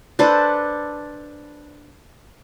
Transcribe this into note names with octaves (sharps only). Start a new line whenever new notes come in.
D4 A4 B4 C5